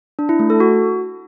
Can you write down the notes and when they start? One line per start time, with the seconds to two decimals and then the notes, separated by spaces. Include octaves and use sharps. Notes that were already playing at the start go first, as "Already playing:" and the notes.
0.19 D4
0.29 E4
0.39 A3
0.50 A4
0.60 F#4